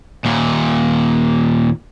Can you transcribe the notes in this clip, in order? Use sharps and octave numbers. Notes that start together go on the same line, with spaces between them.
D#2 A#2